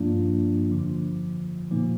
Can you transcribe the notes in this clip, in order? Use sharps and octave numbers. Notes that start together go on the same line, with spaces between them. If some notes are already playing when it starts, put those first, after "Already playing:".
Already playing: G2 F3 A#3 D4 F4
F2 D3 F3
A#2 F3 A#3 D#4